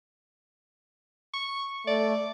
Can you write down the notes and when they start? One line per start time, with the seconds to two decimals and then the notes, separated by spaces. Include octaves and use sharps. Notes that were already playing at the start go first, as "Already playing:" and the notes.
1.34 C#6
1.87 A3 D5